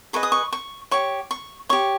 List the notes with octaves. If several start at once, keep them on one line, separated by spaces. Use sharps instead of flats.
G#4 B4 D#5 C#6
D#6
C#6
C#6
G4 C#5 C#6
C#6
G4 C#5 C#6